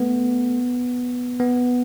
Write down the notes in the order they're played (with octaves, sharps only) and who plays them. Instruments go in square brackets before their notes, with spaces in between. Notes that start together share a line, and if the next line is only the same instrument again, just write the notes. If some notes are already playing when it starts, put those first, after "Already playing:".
Already playing: [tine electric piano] A3 B3
B3